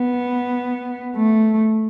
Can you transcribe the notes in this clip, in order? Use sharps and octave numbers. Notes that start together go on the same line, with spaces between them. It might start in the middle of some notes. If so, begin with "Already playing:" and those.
Already playing: B3
A3